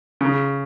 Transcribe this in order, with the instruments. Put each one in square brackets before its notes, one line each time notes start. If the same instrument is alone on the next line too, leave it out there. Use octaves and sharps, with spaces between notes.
[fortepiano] C#3